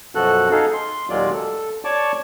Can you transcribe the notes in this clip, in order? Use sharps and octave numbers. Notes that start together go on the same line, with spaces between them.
F#2 B2 F3 F#4 A4 F#6
D#4 G#4 A4 F5
C6
D#2 A#2 F#3 G#3 F4 D5
A4
C#5 D5 A5 C#6 D6